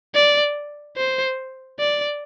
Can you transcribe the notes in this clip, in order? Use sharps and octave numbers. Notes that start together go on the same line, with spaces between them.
D5
C5
D5